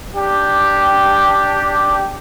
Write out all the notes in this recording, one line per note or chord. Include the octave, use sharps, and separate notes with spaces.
D4 G4